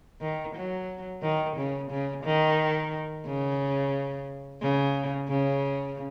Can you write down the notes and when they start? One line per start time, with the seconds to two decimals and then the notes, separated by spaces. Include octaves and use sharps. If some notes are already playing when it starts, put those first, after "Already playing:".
0.21 D#3
0.55 F#3
1.22 D#3
1.56 C#3
1.90 C#3
2.24 D#3
3.25 C#3
4.61 C#3
5.28 C#3